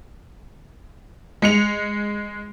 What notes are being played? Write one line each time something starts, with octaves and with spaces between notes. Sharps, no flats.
G#3 C#7 F7